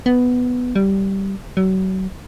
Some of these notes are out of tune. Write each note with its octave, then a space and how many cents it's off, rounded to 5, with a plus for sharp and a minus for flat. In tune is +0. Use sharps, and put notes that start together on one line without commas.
B3 +5
G3 -10
F#3 +35